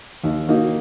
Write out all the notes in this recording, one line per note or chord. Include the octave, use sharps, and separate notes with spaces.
D#2
D#3 A#3 D#4 F#4